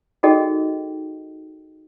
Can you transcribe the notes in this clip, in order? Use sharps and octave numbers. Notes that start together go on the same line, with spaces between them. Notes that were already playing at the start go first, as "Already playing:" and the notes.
D#4 F#4 G#4 A4 D#5 G5